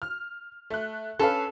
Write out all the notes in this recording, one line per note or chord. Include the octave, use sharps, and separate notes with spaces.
F6
A3 F#6
C#4 A4 B4 F5